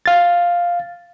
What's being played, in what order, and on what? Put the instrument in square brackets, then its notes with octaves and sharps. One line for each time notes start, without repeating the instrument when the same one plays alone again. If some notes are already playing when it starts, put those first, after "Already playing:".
[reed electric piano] F5 A6